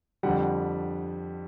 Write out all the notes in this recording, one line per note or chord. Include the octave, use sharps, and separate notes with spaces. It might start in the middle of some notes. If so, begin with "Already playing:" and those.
F2 D3 G3 F#5